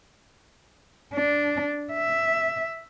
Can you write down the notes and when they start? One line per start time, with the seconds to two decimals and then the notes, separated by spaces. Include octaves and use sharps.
1.14 D4
1.93 E5